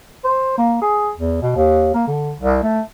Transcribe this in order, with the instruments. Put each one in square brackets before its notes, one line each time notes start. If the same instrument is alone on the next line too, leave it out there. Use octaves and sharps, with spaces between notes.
[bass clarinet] C5
A#3
G#4
E2
B2
D#2
A#3
D3
C2
A3